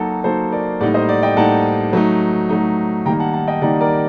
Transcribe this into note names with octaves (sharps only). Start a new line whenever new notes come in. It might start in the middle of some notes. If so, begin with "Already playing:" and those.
Already playing: F#3 A#3 D#4 F#4 A4
F#3 A#3 D#4 A4 C5
A#4 D5
A2 G3 A#3 D#4 D5 F#5
C5 D#5
D5 F#5
D#5 G5
A2 G3 A#3 D#4 F#5 A5
F#3 A3 D#4
F#3 A3 D#4
D#3 G3 A#3 D#4 G5 A#5
F#5 A5
F#5 A5
D#5 G5
D#3 G3 A#3 D#4 D5 F#5
A#4 D5